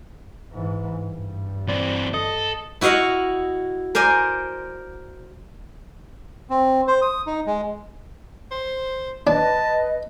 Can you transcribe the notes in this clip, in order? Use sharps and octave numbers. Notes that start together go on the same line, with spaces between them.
G#2 E3
G2
E3 C4 D5
A4 D#5
E4 F#4 D#5 F5 F#5
A#4 C5 D5 G#5
C4
C5
D#6
D#4
G#3
C5
D4 B4 D#5 A5